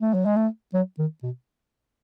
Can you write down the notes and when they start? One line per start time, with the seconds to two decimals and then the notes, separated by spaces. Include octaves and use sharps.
0.01 A3
0.14 F#3
0.26 G#3
0.37 A3
0.74 F#3
0.99 D#3
1.23 B2